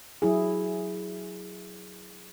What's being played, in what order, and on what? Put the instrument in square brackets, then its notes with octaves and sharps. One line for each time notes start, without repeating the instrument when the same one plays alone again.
[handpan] F#3 E4 G#4